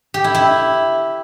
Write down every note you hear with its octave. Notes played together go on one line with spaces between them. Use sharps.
G4
E4
E4